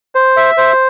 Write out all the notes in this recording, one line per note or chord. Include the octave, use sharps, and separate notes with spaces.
C5
E5
C5